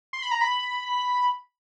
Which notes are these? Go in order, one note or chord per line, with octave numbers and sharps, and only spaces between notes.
C6
B5
A#5
B5